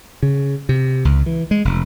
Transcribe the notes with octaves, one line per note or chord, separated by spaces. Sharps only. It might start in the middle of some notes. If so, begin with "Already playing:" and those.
C#3
C3
C#2
E3
G#3
F1